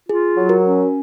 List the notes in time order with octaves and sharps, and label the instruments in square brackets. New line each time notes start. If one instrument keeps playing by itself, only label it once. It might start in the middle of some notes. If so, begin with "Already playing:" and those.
[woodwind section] F4 [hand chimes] G#4
[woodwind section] F#3
[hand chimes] F#4 A#4
[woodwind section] C#4